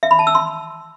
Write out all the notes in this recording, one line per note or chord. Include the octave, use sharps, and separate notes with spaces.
E5
B5
A5
E6
C6